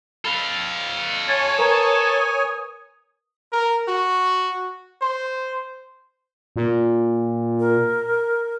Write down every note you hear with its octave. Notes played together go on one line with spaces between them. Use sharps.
A4 F5 B5 F7 G7
C#5 G#5 A6
A#4 B4 A#5 D#6
A#4
F#4
C5
A#2
A#4